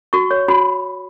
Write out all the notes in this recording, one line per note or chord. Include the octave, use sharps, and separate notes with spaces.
F#4 C#6
C#5
F#4 B5